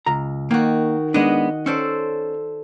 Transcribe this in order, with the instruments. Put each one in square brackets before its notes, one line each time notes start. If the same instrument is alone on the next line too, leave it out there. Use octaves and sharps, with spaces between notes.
[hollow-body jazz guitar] C#2 A#5
[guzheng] D#3 F#4 [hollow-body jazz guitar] A#3
[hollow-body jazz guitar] G#3 B3 D4 [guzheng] D#5 F#5
[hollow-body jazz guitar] C#4 [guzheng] A4 C5 D5